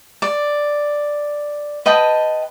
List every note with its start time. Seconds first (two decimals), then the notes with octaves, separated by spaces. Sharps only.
0.22 D5
1.86 B4 D#5 G5 A5